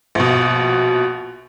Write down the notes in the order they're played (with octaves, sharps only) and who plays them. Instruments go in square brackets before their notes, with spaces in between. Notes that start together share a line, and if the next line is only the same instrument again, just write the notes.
[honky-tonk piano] A#1 B2